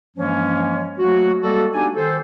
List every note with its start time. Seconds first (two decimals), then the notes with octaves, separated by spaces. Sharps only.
0.17 G2 E3 F3 G#3 A#3 C#4
0.99 F#3 A3 A#3 F#4
1.42 G3 G#3 A#3 F#4 A4
1.74 B3 D4 D#4 G4 G#5
1.97 D#3 A4 C5